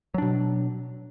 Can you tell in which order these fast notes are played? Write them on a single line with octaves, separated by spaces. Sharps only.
F#3 D4 B2